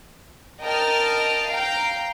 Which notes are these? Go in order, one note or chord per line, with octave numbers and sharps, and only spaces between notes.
A#4 D#5 G5 A5 F6
F5 G5 A#5